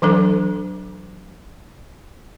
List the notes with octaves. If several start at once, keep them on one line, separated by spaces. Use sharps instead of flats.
E3 F#3 D4 A4